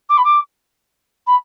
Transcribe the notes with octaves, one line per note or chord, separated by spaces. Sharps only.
D6
B5
D6
B5